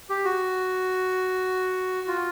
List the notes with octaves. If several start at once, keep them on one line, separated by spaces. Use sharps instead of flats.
G4
F#4
F4